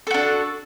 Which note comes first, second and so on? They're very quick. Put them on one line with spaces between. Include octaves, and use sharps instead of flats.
A4 F#4 D4